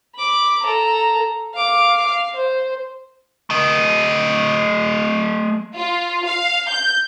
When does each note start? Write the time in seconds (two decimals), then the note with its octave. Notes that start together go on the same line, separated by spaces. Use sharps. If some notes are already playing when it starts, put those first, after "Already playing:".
0.15 B5 D6
0.62 A4 A#5
1.53 F5 D6
2.05 F5
2.35 C5
3.50 A3 D#5
5.75 F4
6.27 F5
6.69 G6